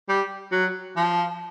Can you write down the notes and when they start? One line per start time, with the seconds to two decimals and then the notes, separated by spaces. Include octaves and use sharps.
0.09 G3
0.52 F#3
0.96 F3